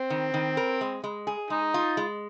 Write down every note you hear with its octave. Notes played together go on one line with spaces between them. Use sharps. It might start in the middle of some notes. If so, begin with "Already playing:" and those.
Already playing: C4
D#3
D#3
A#4
G#3
G#3
G#4
G#3 D#4
F4
G#3